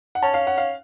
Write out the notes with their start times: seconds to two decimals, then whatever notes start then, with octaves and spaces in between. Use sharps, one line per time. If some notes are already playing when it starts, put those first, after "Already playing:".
0.15 F#5
0.23 C#4 A5
0.34 F5
0.47 F#5
0.58 F5